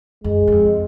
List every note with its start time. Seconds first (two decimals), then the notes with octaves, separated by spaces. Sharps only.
0.24 F#2 G#3
0.47 F#2
0.52 F2